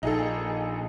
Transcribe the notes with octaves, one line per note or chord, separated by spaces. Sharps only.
A#1 D#4 G#4 A4